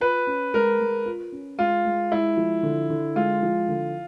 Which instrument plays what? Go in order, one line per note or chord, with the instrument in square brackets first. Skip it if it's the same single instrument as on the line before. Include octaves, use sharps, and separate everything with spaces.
[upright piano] F4 [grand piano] B4
[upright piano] C#4
[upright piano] G#3 [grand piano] A#4
[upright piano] G#3
F4
C#4
[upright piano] G#3 [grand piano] F4
[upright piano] G#3
[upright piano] G#3 [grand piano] E4
[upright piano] F3
D3
D3
[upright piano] G#3 [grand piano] F4
[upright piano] F3
D3